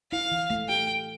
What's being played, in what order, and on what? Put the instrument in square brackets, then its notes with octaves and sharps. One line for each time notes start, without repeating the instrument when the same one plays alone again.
[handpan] E4 [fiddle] F5
[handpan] E3
A3
[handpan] G4 [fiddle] G5
[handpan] G4